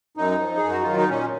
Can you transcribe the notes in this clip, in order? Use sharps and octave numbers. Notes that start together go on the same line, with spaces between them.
F#2 D#4
F3
G#4
F#2
F#4
D#3 F#3 F4
D#4
A#2 C#4